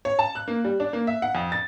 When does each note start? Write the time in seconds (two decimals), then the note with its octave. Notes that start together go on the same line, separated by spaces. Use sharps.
0.05 C#5
0.19 A5
0.35 F#6
0.48 A#3
0.64 G3
0.80 D4
0.93 A#3
1.07 E5
1.22 F#5
1.35 F2
1.52 A6